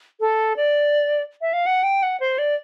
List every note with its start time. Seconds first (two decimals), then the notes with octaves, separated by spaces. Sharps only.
0.20 A4
0.57 D5
1.41 E5
1.53 F5
1.66 F#5
1.83 G5
2.03 F#5
2.20 C5
2.38 D5